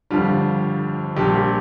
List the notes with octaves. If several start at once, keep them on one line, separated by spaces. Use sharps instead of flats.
G1 F2 D3 G3 F4
A#1 A#2 G3 G4
G4